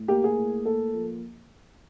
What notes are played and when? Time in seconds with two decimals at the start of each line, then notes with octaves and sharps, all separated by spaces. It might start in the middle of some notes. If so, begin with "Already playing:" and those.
Already playing: A2
0.08 A#3 G4
0.24 G#4
0.37 A2
0.65 A#3 A4
0.93 F3